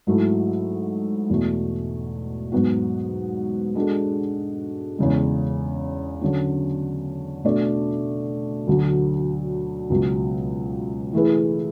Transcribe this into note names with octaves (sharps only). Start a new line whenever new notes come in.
G#2 F#3 A3 E4 A4
E2 B2 A3
G#2 F#3 B3 F#4
G#3 D4 F#4 A4
E2 C#3 G#3
D3 F#3 C#4
B2 A3 D4 A4 D5
D2 D3 F#3
C#2 B2 F#3
E3 A3 E4 G#4 B4